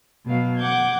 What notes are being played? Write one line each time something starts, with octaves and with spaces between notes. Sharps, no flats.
B2 F#3 F5
F#5 D6 G6 G#6